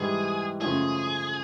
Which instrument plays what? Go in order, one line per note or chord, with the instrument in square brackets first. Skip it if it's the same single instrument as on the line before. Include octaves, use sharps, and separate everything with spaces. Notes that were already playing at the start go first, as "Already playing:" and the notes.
Already playing: [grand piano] G#2 E3 G3 [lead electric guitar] G#4
[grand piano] F#2 C#3 F3 A3 [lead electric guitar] G#4